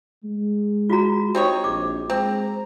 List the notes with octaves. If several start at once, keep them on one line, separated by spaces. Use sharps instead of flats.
G#3
F4 F#4 A#5
C4 D#4 G4 C#5
A#1 D6
G#3 C4 A#5